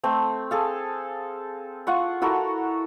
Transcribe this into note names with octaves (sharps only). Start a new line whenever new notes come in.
A3 C4
G#4 A4 F5
F4 F#5 C#6
E4 F#4 A4 A#4